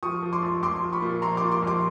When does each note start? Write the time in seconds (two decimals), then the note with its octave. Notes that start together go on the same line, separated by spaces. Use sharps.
0.03 F3 C#6 D#6
0.23 F3
0.33 C6 D6
0.42 A#1
0.62 A#1 C6 D6
0.82 F3
0.93 B5 C#6
1.02 A#2
1.22 A#1 A#5 C6
1.37 C6 D6
1.42 A#2
1.52 C6 D6
1.62 A#1 C6 D6